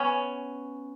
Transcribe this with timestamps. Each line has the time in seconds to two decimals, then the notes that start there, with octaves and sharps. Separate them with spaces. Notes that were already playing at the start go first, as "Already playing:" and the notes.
Already playing: B3 C#4